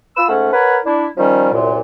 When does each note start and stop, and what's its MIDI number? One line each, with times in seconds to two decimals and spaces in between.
0.17 0.26 65
0.17 0.26 83
0.17 0.26 88
0.29 0.52 44
0.29 0.52 57
0.29 0.52 61
0.29 0.52 78
0.53 0.79 70
0.53 0.79 71
0.53 0.79 73
0.53 0.79 78
0.85 1.05 62
0.85 1.05 64
1.17 1.52 51
1.17 1.52 53
1.17 1.52 55
1.17 1.52 61
1.53 1.80 36
1.53 1.80 42
1.53 1.80 46